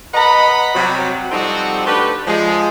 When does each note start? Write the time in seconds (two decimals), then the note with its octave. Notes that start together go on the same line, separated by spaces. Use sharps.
0.14 B4 D#5 F#5 A#5 B5
0.75 C3 F#3 G3
1.32 F3 G3 C4 D#4 F#4 A4
1.87 A3 D4 G4 B4
2.27 F3 G#3